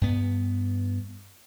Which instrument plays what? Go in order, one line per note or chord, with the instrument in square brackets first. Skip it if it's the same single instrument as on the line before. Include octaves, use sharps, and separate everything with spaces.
[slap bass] G2 B3